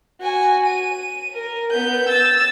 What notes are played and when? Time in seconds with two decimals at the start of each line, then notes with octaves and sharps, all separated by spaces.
0.21 F#4 G#5
0.65 D#7
1.34 A#4
1.70 B3 G6
2.08 E6 A6